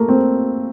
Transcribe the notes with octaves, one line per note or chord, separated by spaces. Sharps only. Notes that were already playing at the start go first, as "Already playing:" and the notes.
Already playing: A3 A#3
C4